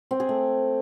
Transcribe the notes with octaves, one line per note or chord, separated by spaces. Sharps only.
C4
G#4
A3